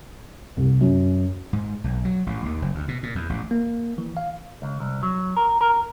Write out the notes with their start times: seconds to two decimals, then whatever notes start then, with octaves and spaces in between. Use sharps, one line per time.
0.57 C2
0.81 F#2
1.53 G#2
1.84 B1
2.05 F#3
2.26 A1
2.45 D#2
2.62 F#1
2.75 D2
2.88 B2
3.03 A#2
3.15 E2
3.30 A1
3.51 A#3
3.98 E3
4.17 F5
4.62 C#2
4.80 C2
5.03 F#3
5.37 A#4
5.61 A#4